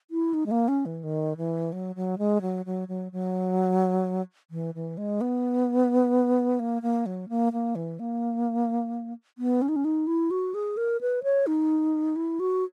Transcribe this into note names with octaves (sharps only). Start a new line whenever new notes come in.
E4
D#4
G#3
A#3
C#4
E3
D#3
E3
F#3
F#3
G#3
F#3
F#3
F#3
F#3
E3
E3
G#3
B3
A#3
A#3
F#3
A#3
A#3
E3
A#3
B3
C#4
D#4
C#4
D#4
E4
F#4
G#4
A#4
B4
C#5
D#4
E4
F#4